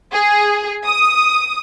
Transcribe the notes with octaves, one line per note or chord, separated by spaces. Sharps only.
G#4
D#6